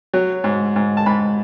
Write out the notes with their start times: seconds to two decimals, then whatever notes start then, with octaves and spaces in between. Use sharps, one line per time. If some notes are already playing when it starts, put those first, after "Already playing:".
0.14 F#3
0.44 G#2
0.76 G#2
0.97 A5
1.06 G#2 B5